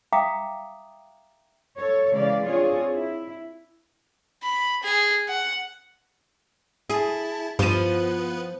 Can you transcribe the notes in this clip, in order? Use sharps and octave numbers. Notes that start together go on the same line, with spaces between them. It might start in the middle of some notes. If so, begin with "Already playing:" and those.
E5 F5 G5 A#5 D6 D#6
A4 C#5
C#3 E3 G#3 D5 F5
C4 D4 F4 G#4 C#5
E4
B5
G#4
F#5
E4 G#4 A5
G2 F3 B3 E4 B4 D#7